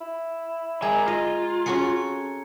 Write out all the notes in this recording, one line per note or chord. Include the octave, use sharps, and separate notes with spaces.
E4
G#3 A#4 G#5 A#5 G#6
F4 D#5
C#4 F#4 G#4 A4 C#7